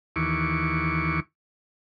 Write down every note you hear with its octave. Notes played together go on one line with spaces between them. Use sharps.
D#2 E3 C#6 D6